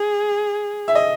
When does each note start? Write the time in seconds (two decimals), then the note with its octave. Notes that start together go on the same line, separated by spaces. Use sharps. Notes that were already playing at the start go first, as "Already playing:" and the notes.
Already playing: G#4
0.88 E5
0.95 D#5